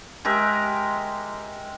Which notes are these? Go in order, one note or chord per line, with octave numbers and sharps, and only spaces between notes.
G#3 G4 A#4 E5